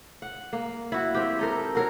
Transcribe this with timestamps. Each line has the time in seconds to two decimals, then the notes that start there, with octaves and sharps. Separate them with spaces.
0.22 F#5
0.53 A#3
0.92 E4 F#4
1.14 C4 G4
1.39 D#4 A4 A#4
1.75 F#4 A#4 C#5